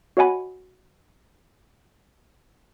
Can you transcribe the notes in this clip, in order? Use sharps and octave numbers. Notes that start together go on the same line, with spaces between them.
F#4 C#5 D#5 F#5 G#5 B5